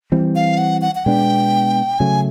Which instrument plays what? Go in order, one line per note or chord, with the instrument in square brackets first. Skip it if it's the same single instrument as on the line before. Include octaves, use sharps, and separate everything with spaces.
[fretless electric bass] E3 G3 C4
[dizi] F5
F#5
F#5
F#5
[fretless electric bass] B2 G#3 B3 D4 [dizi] G5
[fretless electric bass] C#3 F#3 A3 [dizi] G#5